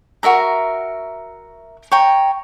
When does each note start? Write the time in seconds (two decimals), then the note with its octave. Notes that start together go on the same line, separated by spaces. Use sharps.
0.23 F#4 A#4 E5 A#5
1.92 C#5 G5 A#5